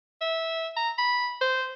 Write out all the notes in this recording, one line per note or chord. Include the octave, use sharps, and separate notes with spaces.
E5
A#5
B5
C5